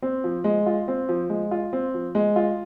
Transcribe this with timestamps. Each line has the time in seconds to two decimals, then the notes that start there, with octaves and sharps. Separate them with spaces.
0.02 C4
0.24 F3
0.44 G#3
0.66 F4
0.88 C4
1.09 F3
1.30 G#3
1.51 F4
1.73 C4
1.94 F3
2.15 G#3
2.36 F4